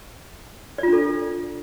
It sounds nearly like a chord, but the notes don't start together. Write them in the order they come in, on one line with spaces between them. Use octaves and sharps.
D5 F4 D4 A4